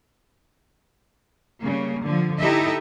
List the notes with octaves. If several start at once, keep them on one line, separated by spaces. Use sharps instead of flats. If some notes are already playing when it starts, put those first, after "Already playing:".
C#3 G3 A#3
D3 F3
D#4 E4 G4 A4 D#5 E5